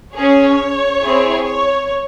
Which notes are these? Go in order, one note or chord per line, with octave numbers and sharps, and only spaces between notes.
C#4 G#4 C#5
C4 E4 G#4
C#5